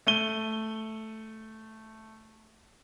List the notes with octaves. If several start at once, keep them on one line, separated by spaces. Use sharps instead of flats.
A3 D#7 G7